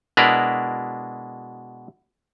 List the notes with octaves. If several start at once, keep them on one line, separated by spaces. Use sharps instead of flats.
B2 G#3 D4 E4 A#4 B4